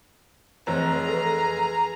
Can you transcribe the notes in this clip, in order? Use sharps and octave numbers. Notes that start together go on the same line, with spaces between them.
F1 E3 G#4 C5 A#5
A4 B4